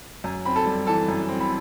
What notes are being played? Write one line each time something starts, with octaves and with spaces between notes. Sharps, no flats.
F#2
C4 B5
A4 A5
G3
E3 A4 A5
F#2
C4
B5